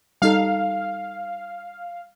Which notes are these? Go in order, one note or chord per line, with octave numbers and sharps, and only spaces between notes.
G3 D#4 A4 F5